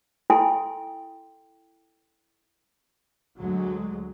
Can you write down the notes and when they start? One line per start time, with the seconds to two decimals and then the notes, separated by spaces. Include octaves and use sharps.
0.30 E4 A4 G5 G#5 C6
3.38 D2 F#3 G#3